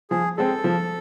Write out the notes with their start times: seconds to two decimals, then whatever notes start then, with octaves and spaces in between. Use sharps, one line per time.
0.10 F3 G#4
0.37 G#3 C4 A4
0.64 F3